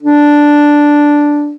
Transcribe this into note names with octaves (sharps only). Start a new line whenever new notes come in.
D4